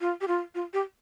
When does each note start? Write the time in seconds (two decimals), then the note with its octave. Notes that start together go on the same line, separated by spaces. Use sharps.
0.01 F4
0.21 G4
0.28 F4
0.55 F4
0.73 G4